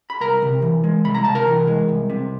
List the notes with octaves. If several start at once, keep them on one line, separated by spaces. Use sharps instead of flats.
B5
C2 A#4 A#5
C3
E3
G#3
C2 B5
A#5
C3 A5
A#4 A#5
E3
G#3
C2
C3